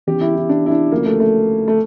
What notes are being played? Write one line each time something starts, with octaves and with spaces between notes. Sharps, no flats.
E2 C#3 E3 G4
E4
E4
D4
E4
D4
D2 C#3 F3 A#3
A3
A3
A3